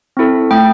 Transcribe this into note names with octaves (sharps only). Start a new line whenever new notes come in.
C4 E4 A4
A3 G5